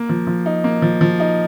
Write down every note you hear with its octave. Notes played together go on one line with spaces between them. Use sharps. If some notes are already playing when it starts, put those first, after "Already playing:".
Already playing: A#3
F3
F3
D#4
A#3
F3
F3
D#4